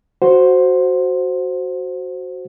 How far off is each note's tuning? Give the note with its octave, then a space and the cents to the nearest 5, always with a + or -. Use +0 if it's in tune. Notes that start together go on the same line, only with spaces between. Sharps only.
F#4 +0 C5 +0 F#5 -15